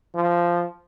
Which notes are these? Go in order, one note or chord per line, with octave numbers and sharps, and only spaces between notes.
F3